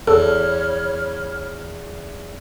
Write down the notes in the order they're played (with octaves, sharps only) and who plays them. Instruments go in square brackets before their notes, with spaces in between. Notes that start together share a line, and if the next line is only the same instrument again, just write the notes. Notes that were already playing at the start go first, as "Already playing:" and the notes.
[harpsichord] E2 [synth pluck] A4 [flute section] C#5 B5 F6